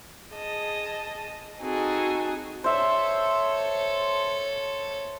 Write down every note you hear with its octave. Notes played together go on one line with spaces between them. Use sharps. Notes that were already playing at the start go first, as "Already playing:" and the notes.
G#4 D#5 A5
C4 D#4 F#4 G#4 A4
A4 C5 C#5 E5